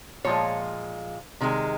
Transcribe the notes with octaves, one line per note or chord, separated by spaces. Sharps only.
A#2 F3 G#3 C#5
C3 D#3 G#3